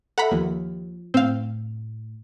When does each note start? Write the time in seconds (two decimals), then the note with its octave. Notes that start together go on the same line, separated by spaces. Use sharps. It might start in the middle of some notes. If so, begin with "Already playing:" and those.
0.18 A4 E5 F#5 A#5 B5
0.31 D#2 F3
1.14 A2 C4 F5